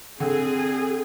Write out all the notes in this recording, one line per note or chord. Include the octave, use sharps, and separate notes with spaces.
D3 C4 G#4